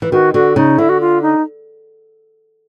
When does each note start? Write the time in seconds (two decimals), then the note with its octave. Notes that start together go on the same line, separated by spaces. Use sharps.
0.02 E3
0.12 D#3 F#4
0.34 D3 F#4
0.56 C#3 D#4
0.78 D3 E4
0.89 F#4
1.01 F4
1.22 D#4